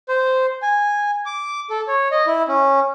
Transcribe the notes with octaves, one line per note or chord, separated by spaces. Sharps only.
C5
G#5
D6
A4
C#5
D#5
E4
C#4